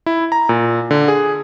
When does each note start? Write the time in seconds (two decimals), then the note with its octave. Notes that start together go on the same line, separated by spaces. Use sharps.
0.06 E4
0.32 A#5
0.49 A#2
0.91 D3
1.08 G#4